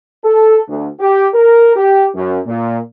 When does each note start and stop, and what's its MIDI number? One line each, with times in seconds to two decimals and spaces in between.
0.24 0.59 69
0.69 0.88 38
1.00 1.27 67
1.34 1.76 70
1.76 2.07 67
2.15 2.40 42
2.46 2.79 46